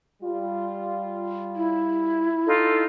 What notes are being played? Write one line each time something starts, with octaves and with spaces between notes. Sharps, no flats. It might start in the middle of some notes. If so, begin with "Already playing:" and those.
G3 F4
E4
D#4 F4 A4